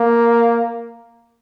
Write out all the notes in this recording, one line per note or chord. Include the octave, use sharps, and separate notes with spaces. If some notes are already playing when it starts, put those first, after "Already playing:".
Already playing: A#3